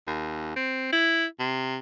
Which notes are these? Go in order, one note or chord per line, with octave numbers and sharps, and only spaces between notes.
D#2
C4
E4
C3